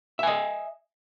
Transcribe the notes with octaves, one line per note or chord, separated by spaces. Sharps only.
D#5 E5 G#5